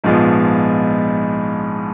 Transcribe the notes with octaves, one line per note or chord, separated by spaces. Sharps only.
A#1 G#2 F3 G#3 B3